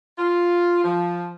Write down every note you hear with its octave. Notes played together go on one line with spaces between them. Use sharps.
F4
F3